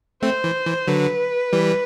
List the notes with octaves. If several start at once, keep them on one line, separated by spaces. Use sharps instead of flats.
A3 C4 C5
E3
E3
D3 F#3 B4
E3 G3